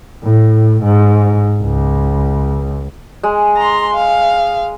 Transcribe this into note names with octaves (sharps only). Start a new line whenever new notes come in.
A2
G#2
C#2
G#3
A#5 C6
F5